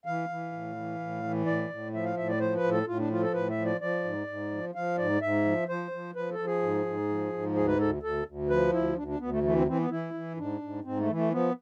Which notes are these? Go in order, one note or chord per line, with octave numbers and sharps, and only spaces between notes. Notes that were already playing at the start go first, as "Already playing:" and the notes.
E3 F5
E3
A2
E3
A2
E3
A2 D5
A2
F3 E5
F5
A2 E5
D5
F3 C5
B4
A2
A4
A2 F4
D4
F3 F4
A4
A2 B4
E5
F3
D5
F3 D5
G#2
G#2
F3
F3 F5
G#2 D5
G#2 E5
F3
F3 C5
F3
F3 B4
A4
F3
G#4
G#2
G#2
F3
G#2
D2 G#4
B4
D2 A4
D2 A4
D2
F3 B4
D2 E4
D2 D4
D4
D2 B3
A3
E3 A3
C4
E3 C4
B3
E3 E4
E3
G#2 D4
G#2
G#2 C4
A3
E3
A3
F3 B3